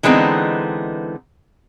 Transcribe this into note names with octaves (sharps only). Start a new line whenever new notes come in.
D3 E3 G#3 B3 C4 D#4